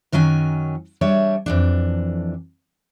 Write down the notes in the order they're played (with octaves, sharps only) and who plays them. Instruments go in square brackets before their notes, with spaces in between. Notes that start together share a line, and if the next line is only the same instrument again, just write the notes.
[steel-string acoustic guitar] F#2 D#3 F#3 C#4 G#5
G3 D4 C#5 E5
F2 E3 D4